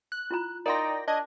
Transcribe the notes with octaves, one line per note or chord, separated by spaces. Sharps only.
F#6
E4 F4 A#5
D#4 A#4 D5 F5 G5 C6 A#6
D4 D#5 G#6